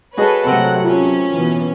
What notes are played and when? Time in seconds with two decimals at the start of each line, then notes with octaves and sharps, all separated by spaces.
0.17 F#4 G#4 A4 B4 C#5 D#5
0.47 C3 F#3 A3 C4 A#4 F#5
0.85 C#4 F4
1.32 B2 E3